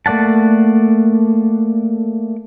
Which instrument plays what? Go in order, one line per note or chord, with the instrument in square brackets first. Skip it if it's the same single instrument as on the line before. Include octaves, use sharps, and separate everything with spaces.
[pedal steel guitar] A3 A#3 D5 F#5 A5